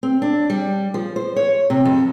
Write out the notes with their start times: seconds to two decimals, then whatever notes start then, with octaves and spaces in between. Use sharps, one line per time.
0.03 C4
0.22 D4
0.50 G3
0.94 F3
1.16 C5
1.36 C#5
1.70 C3
1.85 F2